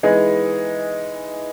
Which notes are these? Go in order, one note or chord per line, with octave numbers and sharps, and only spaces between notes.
E3 G#3 B3 D#4 G#4